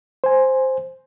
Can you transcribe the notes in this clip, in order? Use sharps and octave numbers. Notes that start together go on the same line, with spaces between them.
C5 G#5